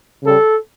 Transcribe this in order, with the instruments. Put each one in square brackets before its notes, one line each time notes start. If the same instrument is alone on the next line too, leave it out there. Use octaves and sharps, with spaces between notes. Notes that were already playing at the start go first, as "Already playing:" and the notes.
[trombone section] C#3 G3 A4